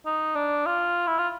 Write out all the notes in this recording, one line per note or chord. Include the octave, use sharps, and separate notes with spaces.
D#4
D4
F4
E4
F4